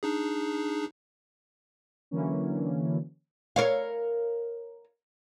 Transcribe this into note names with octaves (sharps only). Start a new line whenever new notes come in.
D4 D#4 G#4
D3 E3 F#3 A#3 C#4
A#4 C#5 F5